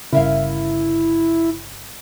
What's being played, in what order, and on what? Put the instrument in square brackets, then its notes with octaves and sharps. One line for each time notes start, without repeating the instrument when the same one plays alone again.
[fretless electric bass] G1 C#3 [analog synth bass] E4 [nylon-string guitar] A#4 E5 F5